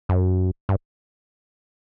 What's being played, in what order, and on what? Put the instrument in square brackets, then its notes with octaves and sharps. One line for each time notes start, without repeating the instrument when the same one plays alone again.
[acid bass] F#2
G2